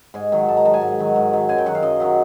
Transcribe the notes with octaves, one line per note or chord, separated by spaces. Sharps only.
G#2 G#5
D#3 F#3
G#2 A5
A#5
D#3 F#3 A5
G#5
G#2
D#3 F#3
G#2
D#3 F#3
F#2 G#5
G5
D#3 F#3 F#5
F5
F#2 D#5
D#3 F#3